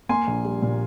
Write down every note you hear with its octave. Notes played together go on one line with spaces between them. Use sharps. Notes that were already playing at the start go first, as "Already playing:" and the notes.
A#3 G#5 C6
A#1
G3
A#2